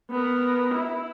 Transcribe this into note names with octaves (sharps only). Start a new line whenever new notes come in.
B3 A#4
E4